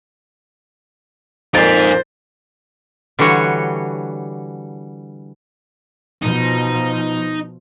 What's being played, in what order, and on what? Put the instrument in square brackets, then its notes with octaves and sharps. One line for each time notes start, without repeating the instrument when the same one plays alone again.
[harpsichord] F2 A#2 [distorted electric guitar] D#4 G#5 [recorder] C5 [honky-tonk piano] A6 D7
[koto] D3 E3 G3 F#4 C#5
[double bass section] B2 F3 [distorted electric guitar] D#4